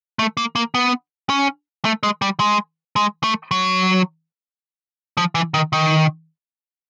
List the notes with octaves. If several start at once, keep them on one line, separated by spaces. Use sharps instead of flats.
A3
A#3
A#3
B3
C#4
A3
G#3
G3
G#3
G#3
A3
F#3
F3
E3
D#3
D#3